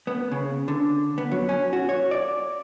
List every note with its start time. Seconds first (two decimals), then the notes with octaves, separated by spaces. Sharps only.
0.07 B3
0.31 C#3
0.68 D3
1.18 B3
1.31 F#3
1.49 C#4
1.73 F#4
1.89 C#5
2.11 D5